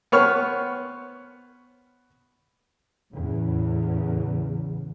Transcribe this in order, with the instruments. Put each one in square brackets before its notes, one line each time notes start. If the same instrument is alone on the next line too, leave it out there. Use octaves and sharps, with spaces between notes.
[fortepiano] B3 C5 C#5 C#6 F6
[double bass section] E2 A2 C#3